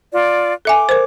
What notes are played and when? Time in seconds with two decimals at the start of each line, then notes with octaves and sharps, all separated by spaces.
0.12 F4 D5
0.65 A4 E5 G#5 D6
0.89 A#4 C5